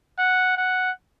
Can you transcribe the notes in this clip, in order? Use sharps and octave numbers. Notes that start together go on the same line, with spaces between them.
F#5
F#5